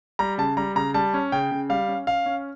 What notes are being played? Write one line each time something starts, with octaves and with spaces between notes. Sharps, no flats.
G3 A#5
C#3 A5
G3 A#5
C#3 A#5
G3 A5
C#4
C#3 G5
C#3
G3 F5
C#4
C#4 F5
C#4